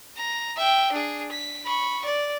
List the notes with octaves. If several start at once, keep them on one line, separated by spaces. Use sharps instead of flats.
A#5
E5 G5
D4 G#4
B6
B5 C#6
D5